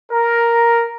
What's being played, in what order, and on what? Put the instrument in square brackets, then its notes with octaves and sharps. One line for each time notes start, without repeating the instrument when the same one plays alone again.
[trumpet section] A#4